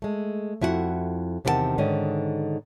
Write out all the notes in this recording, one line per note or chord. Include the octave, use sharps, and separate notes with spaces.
G#3 A3
F2 E4 F#4 G#4 F#5
E2 C3 D#3 F4 F#5 A5
G#2 D3 D#3 C#4 D#5